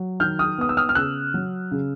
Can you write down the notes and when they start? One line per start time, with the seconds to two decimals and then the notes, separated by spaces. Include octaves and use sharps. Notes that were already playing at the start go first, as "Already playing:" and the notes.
Already playing: F#3
0.20 D#3 F6 G6
0.39 D#6 F6
0.58 B3 D#6
0.69 E6
0.77 D#6 F6
0.89 F6
0.95 C#3 E6 F#6
1.34 F#3
1.71 C#3